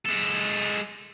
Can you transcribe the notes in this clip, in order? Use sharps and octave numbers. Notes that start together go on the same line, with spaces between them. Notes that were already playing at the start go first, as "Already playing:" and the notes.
G#3 A4